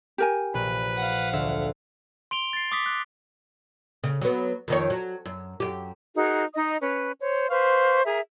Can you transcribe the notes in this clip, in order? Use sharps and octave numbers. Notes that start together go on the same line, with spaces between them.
G4 A#4 G#5
A#1 B4
F5 F#5
D2 E5
C6 D7 F7 G7
A6 C7
D6 D#6 B6
F#6
C#3
F#3 B3
F2 D#3 C#5
F#3
F#2
F#2 G4
D#4 F#4 G#4 A#4
D#4 D#5 D#6
C#4 B4
C5 C#5
B4 C5 F5 C#6
G#4 A#4 E5 A#5